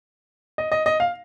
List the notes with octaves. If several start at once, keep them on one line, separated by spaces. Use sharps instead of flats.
D#5
D#5
D#5
F5